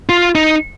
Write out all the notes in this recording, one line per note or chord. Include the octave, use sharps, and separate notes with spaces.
F4
D#4